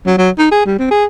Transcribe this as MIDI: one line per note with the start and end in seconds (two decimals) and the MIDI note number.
0.07 0.17 54
0.18 0.30 54
0.38 0.49 63
0.51 0.62 68
0.66 0.77 55
0.79 0.87 60
0.91 1.05 68